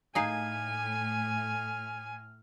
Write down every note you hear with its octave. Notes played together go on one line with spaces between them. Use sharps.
A2 D#4 G#4 F5 G#5 F6